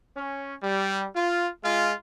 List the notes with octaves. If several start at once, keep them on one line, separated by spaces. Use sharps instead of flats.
C#4
G3
F4
G#3 F4